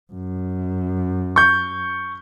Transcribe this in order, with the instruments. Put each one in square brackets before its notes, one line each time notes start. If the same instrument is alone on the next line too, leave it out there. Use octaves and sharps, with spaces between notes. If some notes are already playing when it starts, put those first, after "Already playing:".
[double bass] F#2
[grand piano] C#6 G6